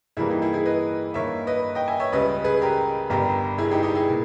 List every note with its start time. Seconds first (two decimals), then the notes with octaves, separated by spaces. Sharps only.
0.17 G2 E3 G3 A#3 E4 G#4
0.30 D#4 G4
0.42 E4 G#4
0.53 E4 G#4
0.65 B4 D#5
1.14 G2 D#3 A#3 C#5 E5
1.47 B4 D#5
1.75 D#5 G5
1.88 E5 G#5
2.00 C#5 E5
2.12 C#2 C#3 G3 B4 D#5
2.44 G#4 B4
2.62 G4 A#4
3.10 G1 G2 G3 G4 A#4
3.58 E4 G#4
3.71 D#4 G4
3.83 D#4 G4
3.95 E4 G#4
4.10 A#2